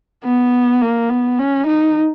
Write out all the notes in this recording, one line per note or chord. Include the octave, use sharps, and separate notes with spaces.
B3
A#3
B3
C#4
D#4